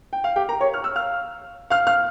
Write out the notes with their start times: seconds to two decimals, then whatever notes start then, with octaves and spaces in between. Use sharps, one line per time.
0.13 G5
0.24 F5
0.36 G4 G5
0.49 A#4 A#5
0.61 C#5 C#6
0.74 F6
0.84 E6
0.95 F5 F6
1.70 F5 F6
1.87 F5 F6